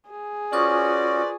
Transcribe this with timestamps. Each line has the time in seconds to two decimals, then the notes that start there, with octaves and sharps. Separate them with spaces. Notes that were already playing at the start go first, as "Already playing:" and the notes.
0.10 G#4
0.53 C#4 F4 F#4 B4 C5 D5 C#6 D#6